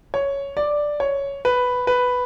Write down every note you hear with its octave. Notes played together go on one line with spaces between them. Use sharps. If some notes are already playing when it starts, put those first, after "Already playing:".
C#5
D5
C#5
B4
B4